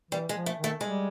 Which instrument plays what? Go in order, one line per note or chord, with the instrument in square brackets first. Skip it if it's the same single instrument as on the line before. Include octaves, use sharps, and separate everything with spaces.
[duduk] E3 [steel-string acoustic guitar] G3
[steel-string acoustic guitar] G#3
[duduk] F3
[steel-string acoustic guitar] A3
[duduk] D#3
[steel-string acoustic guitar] A3
[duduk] G3 [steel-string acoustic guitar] G#3